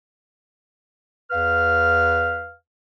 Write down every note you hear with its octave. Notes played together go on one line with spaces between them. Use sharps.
E2 B4 F5 F6